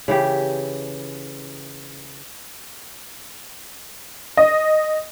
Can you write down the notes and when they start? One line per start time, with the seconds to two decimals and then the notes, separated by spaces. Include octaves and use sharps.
0.08 C#3 E3 G4
4.37 D#5